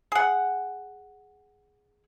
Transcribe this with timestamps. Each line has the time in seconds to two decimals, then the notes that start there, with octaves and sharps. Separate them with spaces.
0.12 G#4 F#5